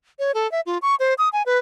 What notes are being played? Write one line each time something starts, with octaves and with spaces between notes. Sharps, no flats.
C#5
A4
E5
F4
C#6
C5
D#6
G#5
B4